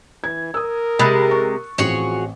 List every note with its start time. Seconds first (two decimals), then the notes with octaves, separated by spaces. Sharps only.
0.24 E3 G#6
0.54 A#4 D#6 E6
0.99 C3 G#3 B5 F#6 A6
1.31 C#6
1.78 A1 F3 C4 F#4 G#4 C#5